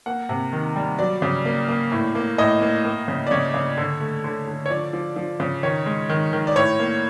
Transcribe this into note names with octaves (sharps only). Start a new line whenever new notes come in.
A#3 F#5
C3
D#3
G3
F#3 D5
C#3
A#3
A#3
A2
A#3
A2 D#5
A#3
A#3
C#3
D5
C#3 C#5
C#3
D3
A3
D3
D3
C#5
F3 D5
F3
F3
C#3
D#3 C#5
G#3
D#3
D#3
D5
A2 C#5
A#3